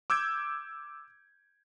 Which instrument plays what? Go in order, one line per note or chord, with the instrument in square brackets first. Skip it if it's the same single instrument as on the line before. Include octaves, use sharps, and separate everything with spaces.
[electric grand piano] D6 E6 G6 G#6 D7